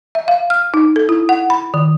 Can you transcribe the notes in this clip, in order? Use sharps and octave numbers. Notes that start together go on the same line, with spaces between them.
E5
F5
F6
D#4
A4
E4
F#5
B5
D#3